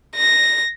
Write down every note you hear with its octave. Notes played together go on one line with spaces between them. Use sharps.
A#6